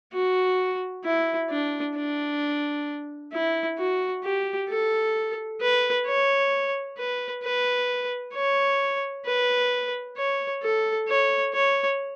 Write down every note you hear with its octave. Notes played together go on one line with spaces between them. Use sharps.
F#4
E4
D4
D4
E4
F#4
G4
A4
B4
C#5
B4
B4
C#5
B4
C#5
A4
C#5
C#5